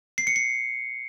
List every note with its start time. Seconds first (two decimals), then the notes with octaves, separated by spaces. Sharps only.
0.18 C7
0.27 C#7
0.36 C7